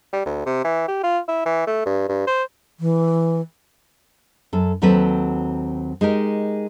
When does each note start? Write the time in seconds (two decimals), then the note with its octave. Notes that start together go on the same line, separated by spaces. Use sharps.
0.13 G3
0.25 D2
0.46 C3
0.64 E3
0.88 G4
1.03 F4
1.28 E4
1.45 E3
1.67 A3
1.86 G2
2.08 G2
2.27 C5
2.80 E3
4.53 F#2 A4
4.82 D#2 F#3 C4 F#4 A4 B4
6.01 G#3 D#4 G4 A#4